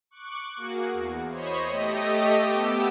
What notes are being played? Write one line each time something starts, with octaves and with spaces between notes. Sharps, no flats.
C#6 D6 F#6
A#3 F#4 G#4
E2
C5 C#5 D#5 B5 C#6
A3 G4 D#5
B3 G4 E6